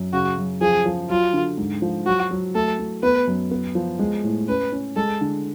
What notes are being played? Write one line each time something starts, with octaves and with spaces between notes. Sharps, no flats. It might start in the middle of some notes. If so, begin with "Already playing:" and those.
Already playing: F#2
C#3 F#4
F#2
F3 G#4
F3
F#3 F4
D3
G#2
F3
F#3 F#4
F#3
A3 A4
A3
B3 B4
F#2
B3
F3
G#3
A2
C#4 B4
C#4
G#3 A4
D3